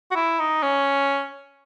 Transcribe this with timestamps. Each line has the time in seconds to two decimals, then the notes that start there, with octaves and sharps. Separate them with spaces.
0.11 F#4
0.16 E4
0.40 D#4
0.63 C#4